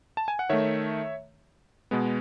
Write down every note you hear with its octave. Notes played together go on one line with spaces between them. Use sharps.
A5
G#5
F#5
D#3 A3 C#5 E5
B2 G#3 B3